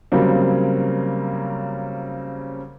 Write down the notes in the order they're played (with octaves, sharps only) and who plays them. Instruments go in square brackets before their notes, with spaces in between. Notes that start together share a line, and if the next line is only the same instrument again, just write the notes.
[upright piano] C#3 F#3 G3 A#3 C4